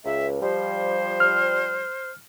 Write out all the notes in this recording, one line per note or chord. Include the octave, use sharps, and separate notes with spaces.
C#2 E5
F3 G3 C5
F6